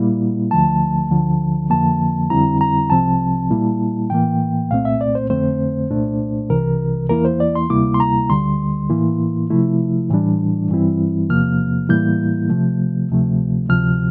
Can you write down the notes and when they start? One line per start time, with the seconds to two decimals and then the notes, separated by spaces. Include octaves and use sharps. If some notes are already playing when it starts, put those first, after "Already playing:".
Already playing: A#2 G3 A#3 E4
0.51 D2 D3 F3 A3 A5
1.10 D2 D3 F3
1.70 F2 D3 F3 A#3 A5
2.30 F2 D3 G3 C4 E4 A#5
2.61 A#5
2.90 C2 C3 F3 C4 A5
3.50 A#2 G3 A#3 E4
4.10 A2 E3 A#3 G5
4.71 C2 A#2 A3 C4 F5
4.85 E5
5.01 D5
5.15 C5
5.30 F2 D3 A3 C4 C5
5.91 C2 A#2 A3 D4
6.50 C2 C3 E3 A#4
7.09 E2 E3 A#3 E4 A#4
7.25 C5
7.40 D5
7.55 C6
7.70 D2 C3 G3 A#3 E4 D6
7.94 C6
8.00 A#5
8.29 D2 D3 G3 C6
8.90 A2 E3 A#3 E4
9.50 C3 F3 A3 E4
10.10 A2 E3 G3 D4
10.69 G2 E3 G3 C4 E4
11.29 E2 C3 F3 A#3 F6
11.89 A2 E3 G3 A#3 E4 G6
12.49 C3 F3 A3
13.10 D2 C3 F3 A3
13.69 D2 C3 F3 F6